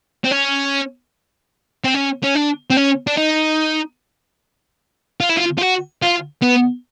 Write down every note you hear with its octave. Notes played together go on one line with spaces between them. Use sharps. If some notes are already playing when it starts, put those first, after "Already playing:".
C4
C#4
C4
C#4
C#4
D4
C4
C#4
D4
D#4
F4
E4
F4
F4
F#4
F4
B3